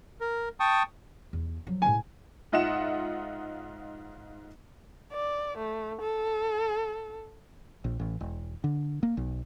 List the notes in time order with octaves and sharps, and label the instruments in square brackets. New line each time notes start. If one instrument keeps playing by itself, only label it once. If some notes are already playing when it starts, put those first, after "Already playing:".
[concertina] A#4
G5 A5 C#6 D#6
[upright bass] E2
F3 F#3
[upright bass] D1 A2 [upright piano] G#5
[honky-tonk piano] G#2 F4 D#5 E5 F#5 E7
[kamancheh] D5
A3
A4
[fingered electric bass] A#1
A1
E1
D3
A#3
B1